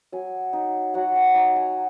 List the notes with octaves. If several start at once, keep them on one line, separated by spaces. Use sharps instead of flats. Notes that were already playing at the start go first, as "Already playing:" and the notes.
F#3 G#5
D#4
F#3 F#5
G#5
D#4 A#5
G#5